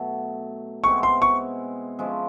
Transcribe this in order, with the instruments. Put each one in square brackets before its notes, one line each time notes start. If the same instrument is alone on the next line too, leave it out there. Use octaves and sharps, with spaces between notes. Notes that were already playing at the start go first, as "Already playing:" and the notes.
Already playing: [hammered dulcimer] B2 F#3 A3
[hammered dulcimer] B2 G#3 C4 E4 [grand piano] C#6
[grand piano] C6
C#6
[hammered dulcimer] F3 G#3 C#4 E4